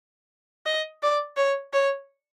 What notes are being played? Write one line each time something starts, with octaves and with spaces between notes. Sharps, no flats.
D#5
D5
C#5
C#5